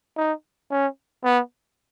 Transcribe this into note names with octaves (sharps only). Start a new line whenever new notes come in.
D#4
C#4
B3